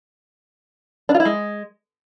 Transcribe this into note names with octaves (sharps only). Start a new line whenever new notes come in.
D4
F4
E4
G#3